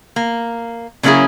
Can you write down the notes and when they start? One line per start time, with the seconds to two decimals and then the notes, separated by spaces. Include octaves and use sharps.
0.16 A#3
1.03 C#3 F#3 A#3 C#4 E4 G#4